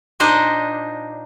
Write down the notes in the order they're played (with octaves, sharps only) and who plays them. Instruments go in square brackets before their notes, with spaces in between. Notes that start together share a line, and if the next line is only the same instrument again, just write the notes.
[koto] A#2 D4 D#4 C5 D#5 G#5